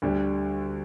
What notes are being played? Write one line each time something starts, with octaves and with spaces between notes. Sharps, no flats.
D2 D3 G3